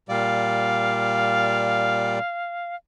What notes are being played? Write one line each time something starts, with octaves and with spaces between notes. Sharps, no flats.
A#2 G3 D5 F5